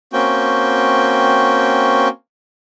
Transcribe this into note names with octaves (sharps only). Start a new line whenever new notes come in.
A#3 C4 C#4 F#4 G5